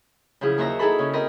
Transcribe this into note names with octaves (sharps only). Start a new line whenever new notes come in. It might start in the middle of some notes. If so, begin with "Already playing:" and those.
C#3 F3 F#3 E4 G#4
D#2 F#4 C5 E5 A#5 E6
D#4 E4 G#4 A4 B5
C#3 C#4
C4 A#4 D#5 B5 F6